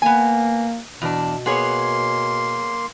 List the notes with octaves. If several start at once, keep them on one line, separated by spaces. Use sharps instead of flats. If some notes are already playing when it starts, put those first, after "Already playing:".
A#3 B3 G#5
E2 B2 D4
A#3 B3 G#4 C#5 C6